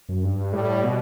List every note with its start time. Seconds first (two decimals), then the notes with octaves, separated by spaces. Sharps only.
0.09 F#2
0.24 G2
0.53 A2 G3
0.83 B2